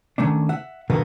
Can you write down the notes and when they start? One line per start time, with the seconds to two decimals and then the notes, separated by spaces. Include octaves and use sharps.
0.18 D#3 A3 C#4 D4
0.49 E5 F#5
0.90 B2 D3 D#3 F#3 A#3 B3